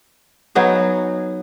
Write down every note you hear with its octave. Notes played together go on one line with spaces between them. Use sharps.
F#3 B3 D#4 G#4